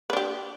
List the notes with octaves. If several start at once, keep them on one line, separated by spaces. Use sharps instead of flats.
D4 G4 B4